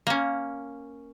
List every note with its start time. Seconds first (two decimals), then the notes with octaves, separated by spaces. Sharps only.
0.07 A#3 C#4